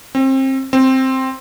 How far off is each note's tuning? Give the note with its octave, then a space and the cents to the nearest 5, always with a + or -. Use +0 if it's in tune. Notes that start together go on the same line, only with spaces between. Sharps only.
C4 +30
C4 +5